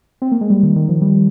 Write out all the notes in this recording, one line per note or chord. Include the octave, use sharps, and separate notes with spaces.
C4
A#3
G#3
G3
D#3
D#3
F3
G3